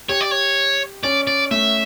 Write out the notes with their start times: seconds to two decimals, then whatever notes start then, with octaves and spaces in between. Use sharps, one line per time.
0.09 G4 C#5
0.21 D5
0.31 C#5
1.03 C#4 D5
1.27 D5
1.51 A3 E5